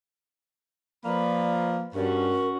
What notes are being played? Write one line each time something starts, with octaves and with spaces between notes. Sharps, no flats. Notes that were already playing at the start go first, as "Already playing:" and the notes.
F3 A#3 B4 D5
G2 C#4 F#4 A#4